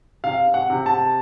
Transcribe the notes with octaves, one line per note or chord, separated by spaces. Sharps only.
C3 F5
F#5
C3
A5